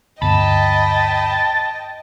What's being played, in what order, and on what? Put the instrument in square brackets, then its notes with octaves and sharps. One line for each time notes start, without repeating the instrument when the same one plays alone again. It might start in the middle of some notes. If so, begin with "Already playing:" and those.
[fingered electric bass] D2 G2 B3 [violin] D#5 G5 [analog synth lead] A5 [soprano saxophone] B5